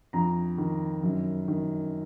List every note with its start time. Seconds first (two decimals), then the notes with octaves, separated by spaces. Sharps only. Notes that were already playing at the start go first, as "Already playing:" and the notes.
0.13 F2 A#5
0.58 D#3
1.03 F#2
1.48 D#3